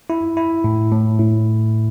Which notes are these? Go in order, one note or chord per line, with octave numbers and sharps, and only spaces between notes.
E4
E4
A2
A2
A2